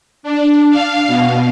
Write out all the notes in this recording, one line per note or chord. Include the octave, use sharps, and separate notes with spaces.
D4
F5
B2